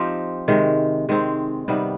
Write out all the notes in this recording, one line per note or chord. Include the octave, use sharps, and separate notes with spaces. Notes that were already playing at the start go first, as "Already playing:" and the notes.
Already playing: F3 C4 D#4 G4
C3 D#3 G#3
D#3 G#3 C4
C3 D#3 G3 B3